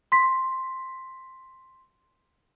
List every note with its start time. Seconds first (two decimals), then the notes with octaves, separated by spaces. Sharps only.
0.12 C6 B6